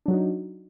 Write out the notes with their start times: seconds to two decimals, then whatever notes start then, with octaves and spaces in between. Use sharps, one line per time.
0.06 D4
0.08 F#3
0.11 F#4
0.13 D#4